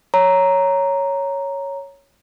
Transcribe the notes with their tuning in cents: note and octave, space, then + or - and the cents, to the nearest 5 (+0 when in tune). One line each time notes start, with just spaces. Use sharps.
C#5 +0 A#5 +0